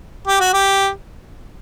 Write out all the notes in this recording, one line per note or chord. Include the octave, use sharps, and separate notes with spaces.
G4
F#4
G4